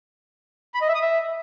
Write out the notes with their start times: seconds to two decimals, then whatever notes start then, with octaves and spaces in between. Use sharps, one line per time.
0.74 B5
0.81 D#5
0.88 E5
0.95 D#6
1.02 E5